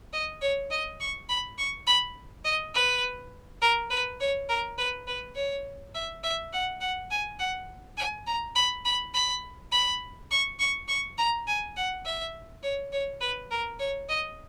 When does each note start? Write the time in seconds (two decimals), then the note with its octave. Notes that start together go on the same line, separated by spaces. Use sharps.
0.13 D#5
0.42 C#5
0.70 D#5
1.00 C#6
1.29 B5
1.58 C#6
1.87 B5
2.45 D#5
2.74 B4
3.61 A#4
3.90 B4
4.20 C#5
4.49 A#4
4.78 B4
5.07 B4
5.35 C#5
5.94 E5
6.23 E5
6.53 F#5
6.81 F#5
7.11 G#5
7.39 F#5
7.97 G#5
8.27 A#5
8.55 B5
8.85 B5
9.14 B5
9.72 B5
10.31 C#6
10.59 C#6
10.88 C#6
11.18 A#5
11.47 G#5
11.76 F#5
12.05 E5
12.63 C#5
12.92 C#5
13.21 B4
13.51 A#4
13.79 C#5
14.09 D#5